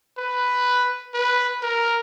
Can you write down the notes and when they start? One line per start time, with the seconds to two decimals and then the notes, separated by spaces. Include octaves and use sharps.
0.18 B4
1.14 B4
1.62 A#4